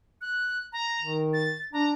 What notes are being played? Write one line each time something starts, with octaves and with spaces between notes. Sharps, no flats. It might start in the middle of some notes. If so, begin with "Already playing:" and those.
F#6
A#5
D#3
A6
D4 A#5